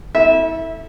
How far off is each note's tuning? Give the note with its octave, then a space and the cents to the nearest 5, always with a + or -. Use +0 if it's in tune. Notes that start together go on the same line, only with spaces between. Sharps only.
E4 -35 A4 +0 E5 -15